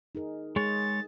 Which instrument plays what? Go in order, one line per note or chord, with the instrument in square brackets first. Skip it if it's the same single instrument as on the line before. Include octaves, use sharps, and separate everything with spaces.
[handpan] D#4 G#4 A#4
[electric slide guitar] G#3 C#5 [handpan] G#4 [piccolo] A6